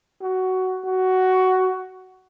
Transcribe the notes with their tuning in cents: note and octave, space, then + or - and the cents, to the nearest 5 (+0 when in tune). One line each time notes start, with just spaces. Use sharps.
F#4 +10
F#4 +10